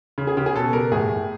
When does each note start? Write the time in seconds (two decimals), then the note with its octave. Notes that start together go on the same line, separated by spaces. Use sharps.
0.18 C#3
0.27 G#4
0.37 C#3 G4
0.46 G#4
0.55 B2 A4
0.73 G3 A#4
0.92 A2 G#4
1.10 A2